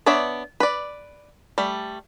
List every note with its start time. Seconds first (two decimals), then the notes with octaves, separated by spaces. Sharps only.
0.06 B3 D4 C#5 D5 E5
0.60 B4 D5
1.58 G3 A3